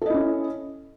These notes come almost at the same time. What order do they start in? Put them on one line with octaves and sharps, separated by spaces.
A4 D#5 E4 C#4